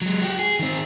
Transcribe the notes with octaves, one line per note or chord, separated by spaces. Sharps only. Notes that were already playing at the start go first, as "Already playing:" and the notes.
F#3 G#3
F#4 G4
G#4
D#3 C4